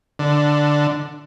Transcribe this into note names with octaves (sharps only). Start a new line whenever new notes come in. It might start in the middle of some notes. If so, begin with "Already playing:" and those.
D3